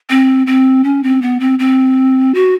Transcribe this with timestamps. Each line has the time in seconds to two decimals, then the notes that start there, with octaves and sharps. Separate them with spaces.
0.10 C4
0.47 C4
0.84 C#4
1.03 C4
1.22 B3
1.40 C4
1.59 C4
2.34 F#4